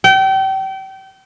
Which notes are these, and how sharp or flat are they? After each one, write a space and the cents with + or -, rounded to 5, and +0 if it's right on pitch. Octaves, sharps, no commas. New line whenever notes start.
G5 -30